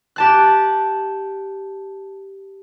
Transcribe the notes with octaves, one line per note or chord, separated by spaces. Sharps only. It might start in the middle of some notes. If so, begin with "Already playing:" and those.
G4 A5 F#6